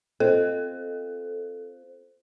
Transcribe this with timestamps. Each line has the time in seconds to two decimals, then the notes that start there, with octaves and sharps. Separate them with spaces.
0.20 C4 F4 A4